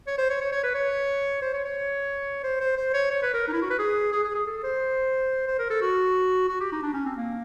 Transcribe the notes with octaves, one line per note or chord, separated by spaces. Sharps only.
C#5
C5
C#5
C#5
C#5
B4
C#5
C5
C#5
C#5
C5
C5
C5
C#5
C#5
B4
A#4
D#4
E4
F#4
B4
G#4
G#4
G#4
G#4
A4
C5
C5
A#4
A4
F#4
F#4
G4
D#4
D4
C#4
C4
A#3